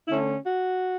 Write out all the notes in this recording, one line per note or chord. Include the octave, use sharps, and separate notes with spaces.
D3 A3 C#4 E4
F#4